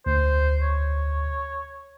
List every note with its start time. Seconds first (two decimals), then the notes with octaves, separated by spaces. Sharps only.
0.06 D2 C5
0.61 C#5